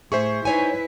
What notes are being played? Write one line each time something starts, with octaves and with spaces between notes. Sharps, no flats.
A2 G#4 C5 E5 C#6
D#4 E4 B4 C#5 G#5